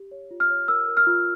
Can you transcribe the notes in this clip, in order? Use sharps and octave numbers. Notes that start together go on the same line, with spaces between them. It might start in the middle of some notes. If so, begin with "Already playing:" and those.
Already playing: G4
C#5
F4
F6
C#5
A#4 E6
A#4
F6
F4